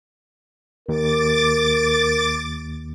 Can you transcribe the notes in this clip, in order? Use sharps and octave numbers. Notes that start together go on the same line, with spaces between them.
D#2 A#4 D6 A6